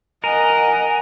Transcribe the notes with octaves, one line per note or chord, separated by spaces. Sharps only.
A#4 D#5 F#5 G#5